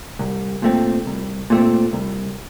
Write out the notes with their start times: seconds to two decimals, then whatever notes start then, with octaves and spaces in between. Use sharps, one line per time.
0.19 C2
0.62 A#2 A3 C4
1.06 C2
1.50 A#2 A3 C4
1.93 C2